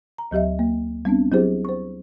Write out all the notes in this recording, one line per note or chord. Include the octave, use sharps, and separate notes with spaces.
A#5
D2 F#3 G4 D#5 E5
A#3
G3 B3 C4 D4
F#3 C4 E4 G4 G#4 C5
C5 C#6